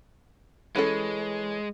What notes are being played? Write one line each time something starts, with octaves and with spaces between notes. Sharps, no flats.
E3 G#3 C#4 A4